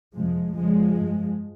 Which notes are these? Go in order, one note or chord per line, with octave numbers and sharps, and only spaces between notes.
F2 C3 F3 G#3
F2 C#3 F3 G#3
G2